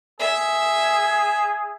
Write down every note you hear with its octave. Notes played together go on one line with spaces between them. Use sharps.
G#4 E5